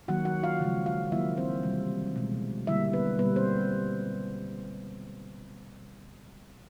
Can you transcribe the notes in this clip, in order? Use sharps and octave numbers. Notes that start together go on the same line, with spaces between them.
D#3 F#3 A#3 F#4 F#5
F#4 F#5
F4 F5
C#3 F3 G#3
F4 F5
D#3 F#3 A#3 E4 E5
C4 C5
C3 E3 G3
B2 G#3
D3 G3 A#3 E4 E5
B3 B4
B2 G3 A#3 B3 B4
C4 C5